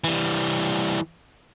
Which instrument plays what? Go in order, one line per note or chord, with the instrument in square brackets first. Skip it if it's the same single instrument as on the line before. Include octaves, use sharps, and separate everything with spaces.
[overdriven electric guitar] E3 G3